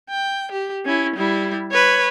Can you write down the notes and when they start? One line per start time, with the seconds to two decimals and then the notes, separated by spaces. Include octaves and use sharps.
0.10 G5
0.52 G4
0.86 C#4 E4
1.16 G3 E4
1.72 B4 C#5